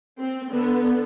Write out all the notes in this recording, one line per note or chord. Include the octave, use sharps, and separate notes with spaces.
C4
D3 B3